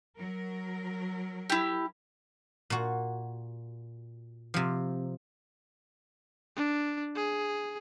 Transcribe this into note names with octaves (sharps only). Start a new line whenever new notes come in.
F#3 A#4
E4 G4
A#2 F#4
C3 F3
D4
G#4